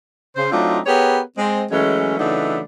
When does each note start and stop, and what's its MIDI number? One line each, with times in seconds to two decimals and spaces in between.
0.36 0.48 49
0.36 0.48 72
0.52 0.79 54
0.52 0.79 57
0.52 0.79 60
0.52 0.79 62
0.52 0.79 63
0.52 0.79 65
0.86 1.20 59
0.86 1.20 67
0.86 1.20 68
0.86 1.20 70
0.86 1.20 71
0.86 1.20 73
1.37 1.64 56
1.37 1.64 60
1.71 2.14 52
1.71 2.14 54
1.71 2.14 56
1.71 2.14 57
1.71 2.14 61
2.19 2.61 49
2.19 2.61 52
2.19 2.61 54
2.19 2.61 57
2.19 2.61 62
2.19 2.61 63